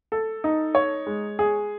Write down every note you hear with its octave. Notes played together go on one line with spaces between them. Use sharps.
A4
D#4
C#5
G#3
G#4